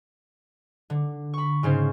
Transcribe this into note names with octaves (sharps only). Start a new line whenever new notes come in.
D3
B5 C#6
G#2 C#3 C#4 C5